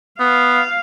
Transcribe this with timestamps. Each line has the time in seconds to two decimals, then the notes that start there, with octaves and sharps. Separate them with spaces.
0.20 B3 F5